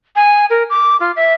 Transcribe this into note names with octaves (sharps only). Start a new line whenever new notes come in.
G#5
A#4
D6
F4
E5